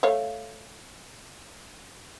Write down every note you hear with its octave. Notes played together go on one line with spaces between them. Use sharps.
A3 C#5 F5